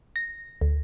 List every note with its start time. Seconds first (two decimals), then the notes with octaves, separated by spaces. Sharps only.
0.16 A#6
0.61 D2